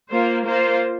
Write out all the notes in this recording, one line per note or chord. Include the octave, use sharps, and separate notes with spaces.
A#3 F4 C5
A#3 F4 C5